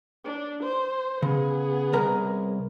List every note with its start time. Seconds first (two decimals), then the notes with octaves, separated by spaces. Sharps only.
0.24 D4
0.63 C5
1.22 C#3 B3 G#4
1.93 C2 A#4 A#5